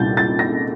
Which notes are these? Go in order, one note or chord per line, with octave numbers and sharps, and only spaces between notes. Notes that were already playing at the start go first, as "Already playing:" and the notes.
Already playing: C2 A#2 G3 G6 A6
A6
A#6